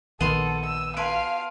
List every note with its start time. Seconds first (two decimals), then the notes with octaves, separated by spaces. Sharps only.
0.21 A#1 D#3 B3 A4 C6 D#7
0.66 E6
0.97 B4 F5 G#5 A5 C6 D7